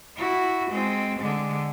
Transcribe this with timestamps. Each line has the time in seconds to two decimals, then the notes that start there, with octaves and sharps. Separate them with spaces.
0.17 E4 F#4
0.71 G#3 C4
1.20 D3 G#3